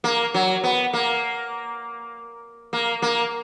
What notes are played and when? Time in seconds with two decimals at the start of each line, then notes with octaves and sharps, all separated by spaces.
0.04 A#3
0.34 F#3
0.64 B3
0.93 A#3
2.73 A#3
3.02 A#3